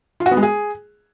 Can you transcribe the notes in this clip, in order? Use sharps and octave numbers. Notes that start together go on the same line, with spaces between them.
F4
F#4
B3
G#3
G#4